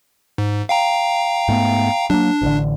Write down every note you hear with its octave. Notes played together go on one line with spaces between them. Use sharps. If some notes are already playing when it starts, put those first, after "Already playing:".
G#2
F5 G5 A#5
G#2 A3 B3
F#3 A#3 D4
A1 D3